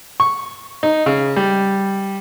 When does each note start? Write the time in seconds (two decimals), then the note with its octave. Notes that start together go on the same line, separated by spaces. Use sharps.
0.20 C#6
0.83 D#4
1.06 C#3
1.36 G3